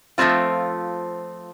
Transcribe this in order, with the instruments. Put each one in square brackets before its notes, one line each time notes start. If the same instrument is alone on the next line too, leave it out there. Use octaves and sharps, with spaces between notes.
[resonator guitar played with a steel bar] F3 A3 A#3 C4 F4